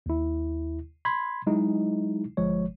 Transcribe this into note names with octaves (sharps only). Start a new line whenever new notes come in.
D#2 E4
B5 C6 G#6
F#3 G#3 D#4 E4
G1 F3 G#3 C#5